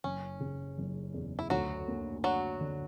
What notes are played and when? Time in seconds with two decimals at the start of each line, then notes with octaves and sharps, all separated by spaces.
0.04 F#1 C#4
0.40 C#3
0.78 F#1
1.14 E2
1.39 E4
1.50 D2 F#3 F#4
1.88 A#3
2.24 F#3 D4 F#4
2.61 D3